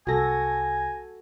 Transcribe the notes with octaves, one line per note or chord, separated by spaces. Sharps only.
C2 F#4 A4 G#5 A#6